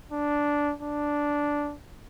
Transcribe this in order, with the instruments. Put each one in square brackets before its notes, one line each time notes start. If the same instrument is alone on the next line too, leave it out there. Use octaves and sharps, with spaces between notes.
[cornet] D4
D4